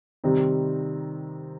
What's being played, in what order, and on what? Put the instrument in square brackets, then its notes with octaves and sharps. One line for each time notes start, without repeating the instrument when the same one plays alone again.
[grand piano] C3 D#3 G3 C4 D#4